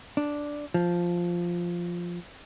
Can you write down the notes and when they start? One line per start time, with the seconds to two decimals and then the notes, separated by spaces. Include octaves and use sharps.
0.17 D4
0.74 F3